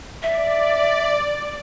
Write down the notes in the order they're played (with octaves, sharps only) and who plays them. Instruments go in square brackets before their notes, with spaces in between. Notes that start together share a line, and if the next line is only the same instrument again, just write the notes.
[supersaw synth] D5 [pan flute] E5